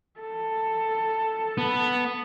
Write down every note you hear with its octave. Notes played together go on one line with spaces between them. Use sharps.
A4
B3